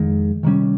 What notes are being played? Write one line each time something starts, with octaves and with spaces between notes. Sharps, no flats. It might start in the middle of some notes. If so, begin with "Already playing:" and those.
Already playing: F2 D#3 G#3
C3 D#3 G3 C#4